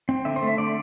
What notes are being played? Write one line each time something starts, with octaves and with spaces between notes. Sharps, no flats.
C4
D3 E5
C5
A3 E5
D3 D5